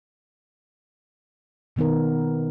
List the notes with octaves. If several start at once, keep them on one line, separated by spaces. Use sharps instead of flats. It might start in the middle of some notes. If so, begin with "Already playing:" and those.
B2 D#3 B3 D#4 A#4